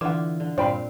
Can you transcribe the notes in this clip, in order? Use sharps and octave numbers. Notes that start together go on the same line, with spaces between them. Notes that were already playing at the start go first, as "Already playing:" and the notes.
D3 E3 E4 F4 F#5 D6 E7
D3
G2 A#2 C4 C5 D5 F5 G5 B5